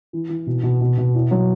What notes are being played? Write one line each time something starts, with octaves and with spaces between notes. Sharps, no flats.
E3
E3
B2
B2
B2
B2
E4
F#3